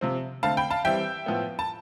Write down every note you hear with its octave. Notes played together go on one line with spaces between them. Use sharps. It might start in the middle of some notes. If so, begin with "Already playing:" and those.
C3 F3 C4
D3 A3 C4 F5 A5
G5 B5
F5 A5
E3 G3 C4 E5 G5
A2 F3 B3
A5